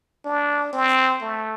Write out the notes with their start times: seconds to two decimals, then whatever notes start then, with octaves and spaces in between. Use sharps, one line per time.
0.25 D4
0.73 C4
1.22 A3